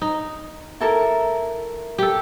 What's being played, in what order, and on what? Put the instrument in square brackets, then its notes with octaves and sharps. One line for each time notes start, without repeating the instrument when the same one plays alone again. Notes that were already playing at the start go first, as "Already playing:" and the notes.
[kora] D#4
[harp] E4 A4 A#4
[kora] G4 A4